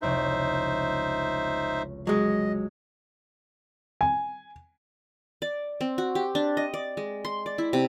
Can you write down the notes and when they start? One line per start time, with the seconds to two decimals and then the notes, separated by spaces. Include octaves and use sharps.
0.02 F1 C#2 D#4 E4 C5 E5
2.07 F#3 G#3 D#5
4.01 G#5
5.42 D5
5.81 C4
5.98 F#4
6.15 G4
6.35 D4
6.57 D#5
6.74 D5
6.97 G#3
7.25 C6
7.46 D5
7.58 E4
7.73 C3